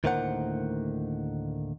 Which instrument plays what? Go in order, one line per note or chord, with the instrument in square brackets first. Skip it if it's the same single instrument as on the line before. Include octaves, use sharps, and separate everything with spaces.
[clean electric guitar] D2 A2 D#3 A#3 C5 F#5